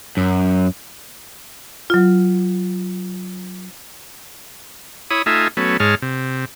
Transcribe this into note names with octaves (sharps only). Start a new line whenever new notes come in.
F#2
F#3 F4
E4 C#5 B5 D#6
A3 D#4 F4 E5 G#5
F#3 A3 B3 C#4
G#2 G#3 C#5 A5 F6
C3